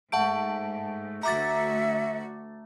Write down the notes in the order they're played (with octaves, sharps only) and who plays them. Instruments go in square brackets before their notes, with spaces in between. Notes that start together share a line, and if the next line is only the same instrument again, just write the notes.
[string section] G#2 [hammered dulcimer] A3 [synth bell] F#5 A5 D7
[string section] D2 F#4 [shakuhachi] E5 [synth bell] A#5 D6 A6